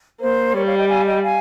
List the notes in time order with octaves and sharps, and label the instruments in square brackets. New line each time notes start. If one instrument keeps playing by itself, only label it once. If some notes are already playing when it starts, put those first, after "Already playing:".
[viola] A#3 [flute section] C5
[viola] G3 [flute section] A#4 C#5
[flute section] C#5 F5
D#5 G5
F5 G#5
D#5 G5
F5 G#5